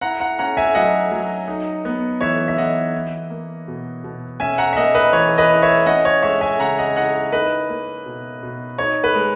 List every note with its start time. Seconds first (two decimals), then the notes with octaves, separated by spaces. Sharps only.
0.01 E4 F#5 A#5
0.20 F#5 A#5
0.39 C#4 F#5 A#5
0.57 E5 G#5
0.74 F#3 D#5 F#5
1.12 F#3
1.48 D#4
1.85 B3
2.21 E3 C#5 E5
2.48 E5
2.58 E3 D#5 F#5
2.94 E4
3.30 A#3
3.68 B2
4.04 B2
4.40 C#4 E5 G#5
4.58 F#5 A#5
4.73 E5
4.76 A#3 D#5 F#5
4.95 B4 D#5
5.13 E3 C#5
5.38 B4 D#5
5.50 E4
5.62 C#5 E5
5.86 C#4 D#5 F#5
6.05 C#5
6.22 G#3 C#5 E5
6.41 E5 G#5
6.59 C#3 F#5 A#5
6.78 D#5 F#5
6.96 E4 D#5 F#5
7.32 D#4 B4 D#5
7.69 A#3
8.06 B2
8.43 B2
8.78 D#4 C#5
9.04 B4
9.15 G#3